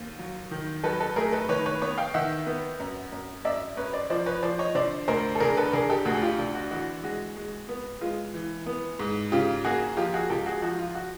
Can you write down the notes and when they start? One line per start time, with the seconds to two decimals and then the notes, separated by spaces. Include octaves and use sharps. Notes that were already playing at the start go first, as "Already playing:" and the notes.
Already playing: D#2
0.19 F#3
0.51 D#3
0.84 F#3 A4 B4
1.00 A4 B4
1.16 A3 G#4 A#4
1.32 A4 B4
1.49 D#3 B4 C#5
1.66 B4 C#5
1.82 B3 B4 C#5
1.98 F5 G5
2.14 D#3 E5 F#5
2.46 B3
2.80 F#2
3.12 F#2
3.45 F#2 D5 E5
3.77 F#2 B4 C#5
3.93 C5 D5
4.10 F3 C5 D5
4.26 B4 C#5
4.43 F3 C5 D5
4.58 C#5 D#5
4.75 D3 C5 D5
5.08 D2 A#4 C5
5.35 A4
5.40 D3 G#4 A#4
5.57 A4 B4
5.73 D3 G#4 A#4
5.89 G4 A4
6.05 D2 F#4 G#4
6.22 F4 G4
6.38 D3
6.54 F#4
6.71 E3 F#4
7.04 G#3 F#4
7.36 G#3
7.69 B3
8.01 G#3 F4
8.34 E3
8.66 B3
8.99 G#2
9.32 C#3 F4 G4
9.65 A#3 F#4 G#4
9.97 F3 F4 G4
10.14 F#4 G#4
10.30 C#2 G4 A4
10.46 F#4 G#4
10.62 F3 F#4
10.79 F4
10.95 F#4